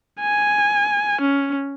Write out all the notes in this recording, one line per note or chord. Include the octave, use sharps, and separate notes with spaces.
G#5
C#4